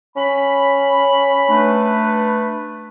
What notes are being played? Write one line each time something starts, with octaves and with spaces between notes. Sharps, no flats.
C#4 B5
A3 D4 B4